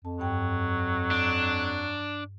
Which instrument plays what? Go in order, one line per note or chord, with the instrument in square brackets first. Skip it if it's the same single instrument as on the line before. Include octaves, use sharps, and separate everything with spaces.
[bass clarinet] F2 [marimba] A5
[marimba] G2 G5 [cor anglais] F#3
[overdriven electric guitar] D4